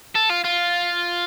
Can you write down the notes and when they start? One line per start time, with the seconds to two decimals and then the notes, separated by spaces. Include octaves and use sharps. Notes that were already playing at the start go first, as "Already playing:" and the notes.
0.16 A4
0.30 F4
0.45 F4